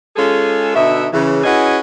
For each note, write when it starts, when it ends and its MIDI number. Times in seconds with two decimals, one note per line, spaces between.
0.16 0.72 56
0.16 0.72 61
0.16 0.72 65
0.16 0.72 68
0.16 0.72 69
0.75 1.06 47
0.75 1.06 50
0.75 1.06 63
0.75 1.06 66
0.75 1.06 76
1.13 1.44 49
1.13 1.44 52
1.44 1.78 61
1.44 1.78 64
1.44 1.78 66
1.44 1.78 68
1.44 1.78 71
1.44 1.78 75